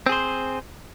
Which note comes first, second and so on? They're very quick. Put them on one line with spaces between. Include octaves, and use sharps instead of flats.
C4 G#4 C5